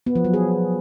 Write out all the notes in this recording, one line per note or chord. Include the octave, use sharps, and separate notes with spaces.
B3
F3
F#3
G#4